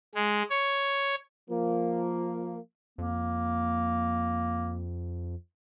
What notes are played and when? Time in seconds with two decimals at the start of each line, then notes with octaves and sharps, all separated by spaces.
0.15 G#3
0.50 C#5
1.50 F3 A#3
2.98 F2 A#3